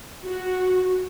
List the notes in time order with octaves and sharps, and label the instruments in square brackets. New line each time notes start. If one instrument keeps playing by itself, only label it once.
[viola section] F#4